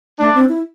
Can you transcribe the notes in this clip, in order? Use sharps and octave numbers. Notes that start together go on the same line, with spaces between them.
A3 D4
C4
E4